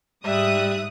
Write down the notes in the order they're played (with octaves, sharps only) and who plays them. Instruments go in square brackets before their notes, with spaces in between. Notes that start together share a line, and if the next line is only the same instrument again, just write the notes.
[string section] G#2 D#6 F#6 [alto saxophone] G3 [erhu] E5